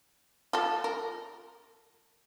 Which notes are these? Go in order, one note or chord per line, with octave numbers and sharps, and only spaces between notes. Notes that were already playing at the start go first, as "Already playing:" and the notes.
F4 A4
A#4